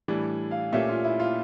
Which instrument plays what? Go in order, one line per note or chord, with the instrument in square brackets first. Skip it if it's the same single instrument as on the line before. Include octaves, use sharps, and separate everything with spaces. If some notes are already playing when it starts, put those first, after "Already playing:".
[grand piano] A2 E3 G3 D4
[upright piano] F5
[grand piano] A#2 A3 C#4 G4 [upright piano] E5
[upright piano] F4
E4
F4